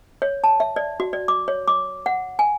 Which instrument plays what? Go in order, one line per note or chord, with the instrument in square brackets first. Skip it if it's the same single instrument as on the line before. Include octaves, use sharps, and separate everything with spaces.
[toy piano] C#5
A5
E5
D5
F#4
D5
D6
C#5
D6
F#5
G#5